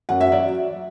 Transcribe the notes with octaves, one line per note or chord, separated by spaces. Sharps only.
F#2 F#5
E5
F#3 D5